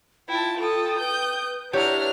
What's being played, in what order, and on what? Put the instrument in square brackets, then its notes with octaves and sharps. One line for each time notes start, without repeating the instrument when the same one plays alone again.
[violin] E4 [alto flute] F4 [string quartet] G5 A5
[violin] A4 [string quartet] G5 D#6
[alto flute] B4 [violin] G6
[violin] D4 F6 [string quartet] E4 F#5 A#5 [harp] G4 C#5